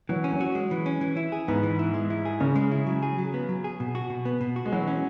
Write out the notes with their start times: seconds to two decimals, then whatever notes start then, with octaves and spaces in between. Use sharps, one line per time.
0.09 E3 F#3
0.24 C#4
0.32 F#3
0.41 F#4
0.55 G#3
0.71 E3
0.86 C#4
1.01 E3
1.17 E4
1.32 G#4
1.48 G#2 B3
1.63 E3
1.79 E4
1.94 G#3
2.10 E4
2.25 G#4
2.40 C#3 C#4
2.55 G#3
2.72 E4
2.87 F#3
3.02 G#4
3.18 F#3
3.34 B3
3.49 F#3
3.64 G#4
3.80 B2
3.95 F#4
4.10 B2
4.25 B3
4.41 B2
4.56 F#4
4.66 G#3
4.72 E3 F#3
4.88 C#4